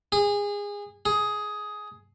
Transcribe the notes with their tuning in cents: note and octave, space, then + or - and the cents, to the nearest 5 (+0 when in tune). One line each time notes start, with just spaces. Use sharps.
G#4 -25
G#4 +10